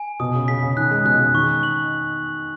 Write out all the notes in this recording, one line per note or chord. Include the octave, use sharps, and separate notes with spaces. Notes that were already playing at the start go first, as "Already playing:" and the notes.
Already playing: G#5
B2 D#6
C#3
C#3 B6
C#3
D#3 F#6
G#3
B2 F#6
C#3
D#3 C#6
F#7